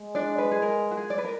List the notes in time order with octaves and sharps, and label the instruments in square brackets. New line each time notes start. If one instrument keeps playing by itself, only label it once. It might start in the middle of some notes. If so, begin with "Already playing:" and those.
Already playing: [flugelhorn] G#3
[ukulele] D4 D5
B4
G#4
A#4
F#4
G#4
D5
B4
A#4